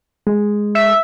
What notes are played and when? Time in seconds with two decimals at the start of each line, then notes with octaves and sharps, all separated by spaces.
0.27 G#3
0.75 E5